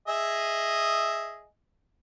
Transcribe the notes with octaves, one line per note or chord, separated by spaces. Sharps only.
G#4 D#5 E5